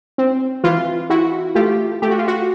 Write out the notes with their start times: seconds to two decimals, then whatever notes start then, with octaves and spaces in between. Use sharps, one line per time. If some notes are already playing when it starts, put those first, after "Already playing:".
0.18 C4
0.64 E3 F4
1.10 E4 F#4
1.55 A3 F4 G4
2.02 A3 G4
2.11 F#4
2.18 F4
2.28 F#4